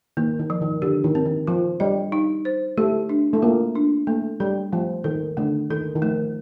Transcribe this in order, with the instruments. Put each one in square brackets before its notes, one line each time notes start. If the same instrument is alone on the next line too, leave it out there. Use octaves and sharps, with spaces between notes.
[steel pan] D#3 [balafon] A#3
[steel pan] D#3
[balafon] F3
[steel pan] D#3
[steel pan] D3 [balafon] G4
[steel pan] D#3
[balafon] C4
[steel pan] D#3
[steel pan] F3 [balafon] F4
[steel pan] G3 [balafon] D#5
[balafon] D#4
C5
[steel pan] A3 [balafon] G4
[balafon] D4
[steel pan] A3
[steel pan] A#3 [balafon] F4
[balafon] D4
[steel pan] A3 [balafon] A#3
[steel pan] G3 [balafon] A4
[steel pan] F3 [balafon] A3
[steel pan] D#3 [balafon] A4
[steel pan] D3 [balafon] A3
[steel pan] D#3 [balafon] A4
[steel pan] D#3
[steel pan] F3 [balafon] A3